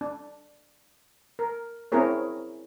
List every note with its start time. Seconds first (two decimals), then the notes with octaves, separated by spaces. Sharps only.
0.01 D4
1.39 A#4
1.92 C4 C#4 E4 G#4 A#4 C#5